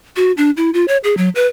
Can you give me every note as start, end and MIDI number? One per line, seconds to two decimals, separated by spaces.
0.16 0.32 66
0.37 0.51 62
0.57 0.70 64
0.74 0.85 65
0.88 0.97 73
1.04 1.17 68
1.17 1.29 54
1.35 1.47 71